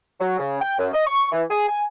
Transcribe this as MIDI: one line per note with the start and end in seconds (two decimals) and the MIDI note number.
0.21 0.35 54
0.39 0.57 49
0.61 0.75 79
0.79 0.89 42
0.93 1.05 75
1.07 1.31 85
1.32 1.43 52
1.50 1.65 68
1.69 1.84 80